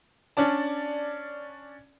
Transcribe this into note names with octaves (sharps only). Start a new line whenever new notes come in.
C#4 D4 D5 A5